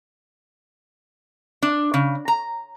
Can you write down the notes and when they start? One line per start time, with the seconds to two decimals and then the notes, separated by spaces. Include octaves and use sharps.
1.62 D4
1.94 C#3
2.28 A#5